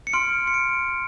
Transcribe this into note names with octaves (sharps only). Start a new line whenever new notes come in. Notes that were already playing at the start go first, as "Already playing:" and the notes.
C#7
C6 F6 D7
C#7
D7